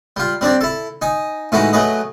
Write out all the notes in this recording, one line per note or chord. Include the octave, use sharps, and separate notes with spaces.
G3 F4
G3 C4 D4 D5
E4 A4
D#4 G#5
A2 E3 G#3 D#4 E4 F#4
F#3 A3 G#4 B4 D#5